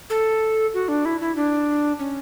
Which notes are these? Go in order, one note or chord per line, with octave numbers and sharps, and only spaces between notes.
A4
F#4
D4
E4
E4
D4
C#4